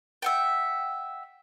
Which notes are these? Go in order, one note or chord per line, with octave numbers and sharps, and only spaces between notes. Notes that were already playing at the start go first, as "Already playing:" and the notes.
E5 F#5 G5